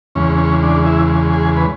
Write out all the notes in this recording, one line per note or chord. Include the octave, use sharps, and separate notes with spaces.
E2 C#3 G#3 C#4
C#4
D4
E4
G#4
B4